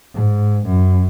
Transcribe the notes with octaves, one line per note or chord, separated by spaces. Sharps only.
G#2
F#2